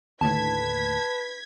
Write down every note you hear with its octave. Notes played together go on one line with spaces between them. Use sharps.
D#2 A2 D3 B4 A5 G#6 B6